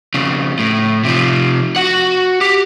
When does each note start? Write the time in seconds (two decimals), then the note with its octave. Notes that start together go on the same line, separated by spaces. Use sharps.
0.14 F2 C#3
0.59 A2
1.04 C3 F3
1.76 F#4 F#5
2.41 G4